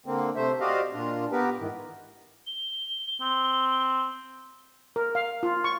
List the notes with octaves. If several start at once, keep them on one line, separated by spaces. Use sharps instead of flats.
D3 A#3 C4
C3 A3 C5 E5
F#4 G4 C5 D5 D#5 F5
A#2 D4 F4
B3 G4 A#4 B4
G#2 D#3 E3
G7
C4
A#4
F5
F4
C#6